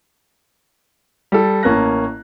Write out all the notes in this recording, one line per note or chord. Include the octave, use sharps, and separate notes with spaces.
G3 A4
A1 A#3 C#4 A5 F#6 A#6